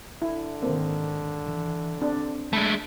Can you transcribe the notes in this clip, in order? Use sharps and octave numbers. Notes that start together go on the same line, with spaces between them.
D3 E4
G#2 D#3 A#3 C4
E3
C4 D4
D3 G#3 A3 A5 B5